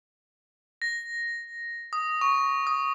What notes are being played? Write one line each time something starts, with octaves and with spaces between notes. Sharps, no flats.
A#6
D#6
C#6
D#6